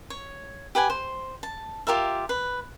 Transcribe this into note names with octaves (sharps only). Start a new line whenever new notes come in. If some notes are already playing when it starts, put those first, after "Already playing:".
C#5
G4 B4 F#5 G#5
C5
A5
F4 G4 A#4 E5
B4